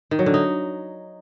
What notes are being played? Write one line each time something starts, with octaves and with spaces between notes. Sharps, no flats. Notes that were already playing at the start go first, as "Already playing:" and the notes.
D#3
F#3
D3
D#4